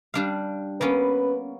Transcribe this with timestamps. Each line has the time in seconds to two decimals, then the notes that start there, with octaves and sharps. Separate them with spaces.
0.14 G3 D4 F5
0.81 A#3 B3 C#4 B4